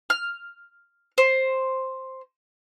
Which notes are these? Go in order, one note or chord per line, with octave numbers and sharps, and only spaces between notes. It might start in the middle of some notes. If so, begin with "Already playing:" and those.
F6
C5